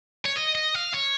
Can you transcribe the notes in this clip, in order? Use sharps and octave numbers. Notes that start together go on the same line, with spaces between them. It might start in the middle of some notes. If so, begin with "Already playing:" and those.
C#5
D#5
D#5
F5
C#5